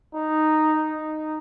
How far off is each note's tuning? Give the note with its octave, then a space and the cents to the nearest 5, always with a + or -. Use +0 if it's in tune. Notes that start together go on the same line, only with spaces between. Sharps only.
D#4 -5
D#4 -10